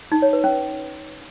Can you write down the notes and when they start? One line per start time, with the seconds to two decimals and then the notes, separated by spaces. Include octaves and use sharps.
0.12 D#4
0.22 C#5
0.33 B4
0.44 C#4